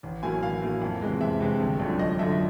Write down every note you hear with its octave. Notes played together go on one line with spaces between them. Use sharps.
A1
A2 F#3 A#3 G#5
A1 F5
A2 F#3 A#3
F2
C3 E3 G#3
F2 E5
C3 E3 G#3
G1
F#2 D3 F3 A3
G1 D#5
F#2 D3 F3 A3 E5